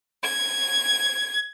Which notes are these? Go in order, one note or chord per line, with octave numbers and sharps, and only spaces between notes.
G#6